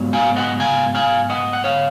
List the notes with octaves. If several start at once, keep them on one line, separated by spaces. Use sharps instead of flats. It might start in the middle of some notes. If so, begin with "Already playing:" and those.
Already playing: G#2 F#3 B3
F5 G#5
D#5 F#5
F5 G#5
F5 G#5
D#5 F#5
F#5
C#5 F5